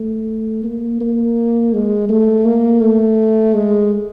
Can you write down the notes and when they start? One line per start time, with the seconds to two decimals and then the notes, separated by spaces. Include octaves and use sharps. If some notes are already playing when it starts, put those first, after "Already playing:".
Already playing: A3
0.63 A#3
1.01 A#3
1.73 G#3
2.09 A3
2.45 A#3
2.81 A3
3.54 G#3